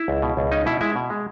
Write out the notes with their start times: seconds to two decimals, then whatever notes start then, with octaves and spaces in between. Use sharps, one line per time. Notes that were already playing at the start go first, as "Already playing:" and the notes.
Already playing: E4 E5
0.08 C#2
0.22 B2
0.37 C#2
0.51 C#4 D#4 D#5
0.66 B2 E4 E5
0.81 G#3 E4 E5
0.96 B2
1.10 G#3